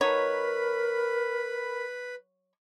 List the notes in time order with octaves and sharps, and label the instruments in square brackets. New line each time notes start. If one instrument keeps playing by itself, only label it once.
[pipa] F#3 D#4 C#5 [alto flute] A#4 [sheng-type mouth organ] B4 B5